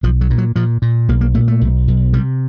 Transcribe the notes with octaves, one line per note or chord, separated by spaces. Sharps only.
B1 F3
F#3
A#2
F#3
A#2 F3
A#2
B1 A#3
A#3
A#2 A3
A3
B1
B1
C3 G3